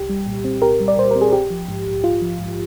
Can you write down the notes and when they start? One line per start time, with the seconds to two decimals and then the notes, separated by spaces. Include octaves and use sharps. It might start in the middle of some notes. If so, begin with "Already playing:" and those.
Already playing: C2 G4
0.09 G3
0.26 A#2
0.44 C4
0.62 C2 G4 A#4
0.80 G3
0.88 D5
0.97 A#2 C5
1.11 C4 A#4
1.21 G#4
1.33 A#1 G4
1.50 F3
1.68 G#2
1.86 A#1
2.04 A#1 F4
2.22 F3
2.39 G#2